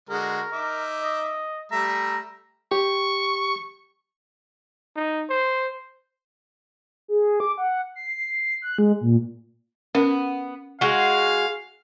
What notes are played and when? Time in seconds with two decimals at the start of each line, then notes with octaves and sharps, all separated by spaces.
0.09 D3 G#3 F#4 A#4
0.52 D#4 E5 D6
1.03 D#5
1.72 G3 A3 E5 A#5
2.72 G4 C#6
4.96 D#4
5.30 C5
7.08 G#4
7.40 D6
7.58 F#5
7.95 C7
8.62 F#6
8.78 G#3
9.01 A#2
9.95 B3 C#4 A#4
10.81 G#3 F#4 F5